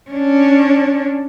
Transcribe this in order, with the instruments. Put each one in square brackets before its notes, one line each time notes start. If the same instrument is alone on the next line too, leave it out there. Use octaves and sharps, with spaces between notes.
[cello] C#4 D4